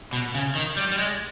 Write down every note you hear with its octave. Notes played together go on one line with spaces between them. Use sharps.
B2
C#3
D#3
G3
G3
G#3